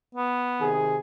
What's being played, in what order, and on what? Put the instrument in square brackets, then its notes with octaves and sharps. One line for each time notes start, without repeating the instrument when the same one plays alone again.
[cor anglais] B3
[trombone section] C3 D#3 G#4